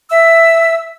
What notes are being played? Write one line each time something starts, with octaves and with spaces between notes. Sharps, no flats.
E5 E6